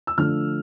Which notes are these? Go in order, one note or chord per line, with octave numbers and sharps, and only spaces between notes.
E6
D3 F3 A3 D4 F6